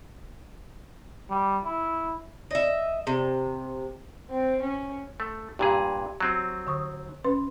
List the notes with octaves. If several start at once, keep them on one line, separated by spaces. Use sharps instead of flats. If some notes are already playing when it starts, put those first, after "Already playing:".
G3
E4
D#5 E5
C3
C4
C#4
A3
G2 A#2 G4 G#4
F#3 C4
D3 C#6 D#6
C#4 B4 C6